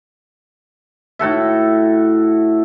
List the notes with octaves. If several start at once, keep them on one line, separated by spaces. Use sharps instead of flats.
A2 F#4 A4 E5